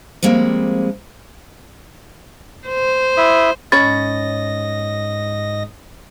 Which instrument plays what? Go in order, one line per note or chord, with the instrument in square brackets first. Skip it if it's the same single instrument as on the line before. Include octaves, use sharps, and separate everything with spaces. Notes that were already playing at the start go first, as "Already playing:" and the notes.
[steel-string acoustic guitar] F3 G3 G#3 A#3 C4
[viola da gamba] C5
[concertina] E4 E5 D#6
[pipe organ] G#2 D#5 A#6 [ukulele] C#4 C#5 B5 [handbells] A6